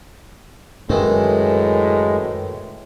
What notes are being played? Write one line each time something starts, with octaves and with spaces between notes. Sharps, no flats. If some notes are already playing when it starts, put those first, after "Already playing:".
F#2 A2 D#3 E3 G#3